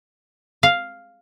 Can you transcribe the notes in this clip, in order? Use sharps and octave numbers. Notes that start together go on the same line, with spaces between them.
F5